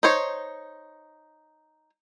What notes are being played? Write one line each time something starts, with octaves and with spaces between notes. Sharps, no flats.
D#4 C5 C#5